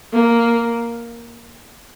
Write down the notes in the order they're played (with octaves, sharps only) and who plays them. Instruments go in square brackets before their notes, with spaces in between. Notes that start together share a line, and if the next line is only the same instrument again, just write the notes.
[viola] A#3